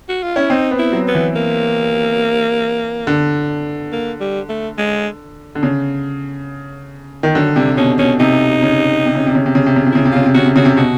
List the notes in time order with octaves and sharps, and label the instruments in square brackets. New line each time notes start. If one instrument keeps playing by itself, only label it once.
[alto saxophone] F#4
F4
[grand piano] C#4 [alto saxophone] E4
[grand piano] C4 [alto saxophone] D#4
[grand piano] B3
[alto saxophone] E4
[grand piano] F#3
[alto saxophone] B3
[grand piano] E3
[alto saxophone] A#3
[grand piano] D3
[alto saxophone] A#3
G3
A3
G#3
[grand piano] D3
C#3
D#3
[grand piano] D3 [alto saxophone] F#3
[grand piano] C3 [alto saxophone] G3
[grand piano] B2 [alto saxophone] C#4
[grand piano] B2 [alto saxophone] C#4
[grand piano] C3 [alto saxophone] D#4
[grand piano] C#3
C3
C#3
C3
C#3
C3
C#3
C3
C#3
C3
[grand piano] C#3 [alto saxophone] E4
[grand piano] C3
[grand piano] C#3 [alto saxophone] F4
[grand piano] C3
[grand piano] C#3 [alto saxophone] F#4
[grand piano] C3
[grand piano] C#3 [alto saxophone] F#4
[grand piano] C3
[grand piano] B2 [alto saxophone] F#4